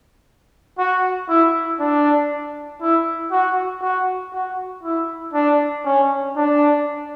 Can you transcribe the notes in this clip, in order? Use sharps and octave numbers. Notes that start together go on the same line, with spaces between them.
F#4
E4
D4
E4
F#4
F#4
F#4
E4
D4
C#4
D4